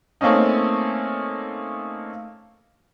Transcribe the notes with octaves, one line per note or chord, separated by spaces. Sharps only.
A3 A#3 C4 C#4 D#4